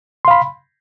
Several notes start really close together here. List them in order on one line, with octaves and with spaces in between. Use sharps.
C6 F5 B5